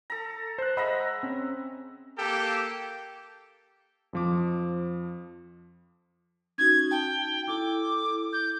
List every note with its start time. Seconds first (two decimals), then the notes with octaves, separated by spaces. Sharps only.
0.10 A4 A#5
0.58 C5 F#6
0.77 G#3 D#5 E5 F#5 A#5 B5
1.23 C4 C#4
2.17 A#3 G4 A4 G5
4.13 F2 F3 D6
6.58 C#4 D#4 F#4 G#6
6.91 G5 A5
7.48 E4 A4 D6
8.33 G6